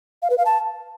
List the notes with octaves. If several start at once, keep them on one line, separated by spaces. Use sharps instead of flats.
F5
B4
F5
A5